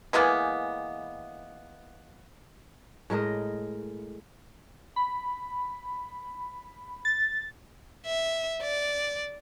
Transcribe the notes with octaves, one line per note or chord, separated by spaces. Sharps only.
E3 G#3 A#3 B3
A2 G#3 A#4 D#5
B5
A6
E5
D5